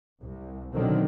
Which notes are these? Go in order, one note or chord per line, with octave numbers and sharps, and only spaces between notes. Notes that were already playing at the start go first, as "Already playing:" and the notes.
C2
B2 D3 D#3 F#3 C4